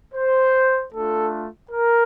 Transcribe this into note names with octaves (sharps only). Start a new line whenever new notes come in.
C5
A3 D4 F4 A4
A#4